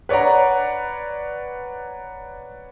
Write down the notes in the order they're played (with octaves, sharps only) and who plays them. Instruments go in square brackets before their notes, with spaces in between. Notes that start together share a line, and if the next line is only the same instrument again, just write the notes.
[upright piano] B4 C#5 D5 F#5 A#5